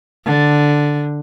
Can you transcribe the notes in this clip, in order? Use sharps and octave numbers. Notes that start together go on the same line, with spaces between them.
D3